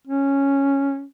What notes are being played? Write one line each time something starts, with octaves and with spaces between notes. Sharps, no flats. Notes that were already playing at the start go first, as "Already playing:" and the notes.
C#4